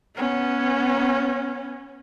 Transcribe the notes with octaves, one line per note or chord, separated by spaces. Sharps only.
B3 C#4